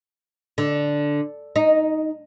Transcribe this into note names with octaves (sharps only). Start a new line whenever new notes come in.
D3
D#4